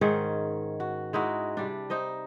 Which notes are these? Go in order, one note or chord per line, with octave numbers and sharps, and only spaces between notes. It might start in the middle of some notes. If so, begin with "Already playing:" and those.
G#2 D#3 C#4 G#4
F#4
G#3 D#4 E4 F#4
C3 G3 D4
D#4 C5 D#5